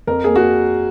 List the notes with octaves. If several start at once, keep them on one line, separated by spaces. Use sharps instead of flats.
F2 A#4
A#3 G#4
F#4